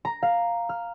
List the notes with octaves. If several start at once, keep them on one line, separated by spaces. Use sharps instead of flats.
A#5
F5
F6